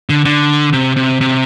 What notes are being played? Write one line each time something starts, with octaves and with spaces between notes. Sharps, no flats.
D3
D3
C3
C3
C3